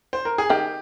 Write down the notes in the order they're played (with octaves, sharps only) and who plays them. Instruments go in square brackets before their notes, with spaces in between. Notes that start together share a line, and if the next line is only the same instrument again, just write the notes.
[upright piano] C5
A#4
G#4
[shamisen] D#3 [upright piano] G4